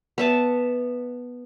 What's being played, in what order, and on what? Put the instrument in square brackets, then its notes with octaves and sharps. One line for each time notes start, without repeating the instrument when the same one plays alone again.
[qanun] B3 E5 A5